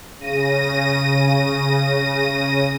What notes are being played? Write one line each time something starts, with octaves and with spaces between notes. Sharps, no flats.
C#3 A#6 D#7